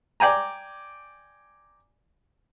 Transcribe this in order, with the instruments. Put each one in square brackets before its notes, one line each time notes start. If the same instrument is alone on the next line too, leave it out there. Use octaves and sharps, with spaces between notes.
[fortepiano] D5 G5 G#5 A#5